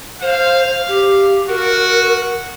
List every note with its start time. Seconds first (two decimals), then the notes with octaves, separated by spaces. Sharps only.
0.22 C5 F5
0.88 G4
1.48 F#4 A#4